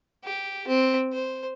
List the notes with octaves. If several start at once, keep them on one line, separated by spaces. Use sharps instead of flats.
G4
C4
C5